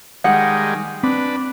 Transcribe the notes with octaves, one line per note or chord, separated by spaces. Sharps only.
D#3 G3 G#3 F#5
C4 D4 B4